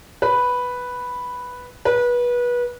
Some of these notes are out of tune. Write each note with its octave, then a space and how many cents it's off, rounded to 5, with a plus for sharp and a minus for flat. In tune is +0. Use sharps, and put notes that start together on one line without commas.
B4 +0
B4 -25